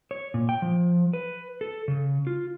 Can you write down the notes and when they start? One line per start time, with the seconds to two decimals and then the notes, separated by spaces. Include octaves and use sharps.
0.11 C#5
0.34 A#2
0.49 G5
0.62 F3
1.13 B4
1.61 A4
1.88 C#3
2.27 F4